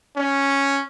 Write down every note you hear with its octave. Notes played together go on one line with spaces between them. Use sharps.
C#4